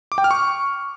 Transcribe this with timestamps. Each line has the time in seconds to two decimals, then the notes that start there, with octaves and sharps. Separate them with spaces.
0.12 D6
0.18 G5
0.24 F6
0.31 C#6